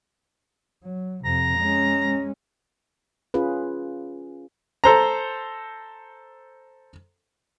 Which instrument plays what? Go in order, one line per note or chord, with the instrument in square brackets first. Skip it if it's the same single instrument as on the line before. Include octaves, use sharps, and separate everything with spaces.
[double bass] F#3
[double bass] F2 C3 [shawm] A#5
[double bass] G#3 C#4
[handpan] C#4 F4 G#4 B4
[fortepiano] A4 C5 A#5